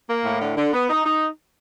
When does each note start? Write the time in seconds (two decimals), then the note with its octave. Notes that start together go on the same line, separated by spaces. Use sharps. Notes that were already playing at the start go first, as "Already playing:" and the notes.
0.08 A#3
0.24 A2
0.40 D3
0.56 D3
0.73 B3
0.89 D#4
1.05 D#4